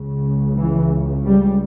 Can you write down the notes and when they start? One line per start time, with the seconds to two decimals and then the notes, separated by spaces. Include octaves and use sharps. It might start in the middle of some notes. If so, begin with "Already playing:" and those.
Already playing: C#2 C#3
0.56 E3
1.26 G3